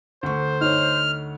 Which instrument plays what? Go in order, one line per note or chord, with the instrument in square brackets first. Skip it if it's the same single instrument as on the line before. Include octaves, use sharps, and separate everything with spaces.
[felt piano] D2 A3 C#6 [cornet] C5
[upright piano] D#4 C#5 [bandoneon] F6